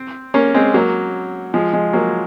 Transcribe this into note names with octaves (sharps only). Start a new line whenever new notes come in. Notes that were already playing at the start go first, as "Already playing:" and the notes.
Already playing: C4
A#3 C#4
G#3 C4
F#3 A#3
F3 G#3
F3 G#3
F#3 A#3